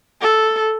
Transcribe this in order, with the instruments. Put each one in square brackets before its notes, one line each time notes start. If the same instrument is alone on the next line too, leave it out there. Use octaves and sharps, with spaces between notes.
[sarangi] A4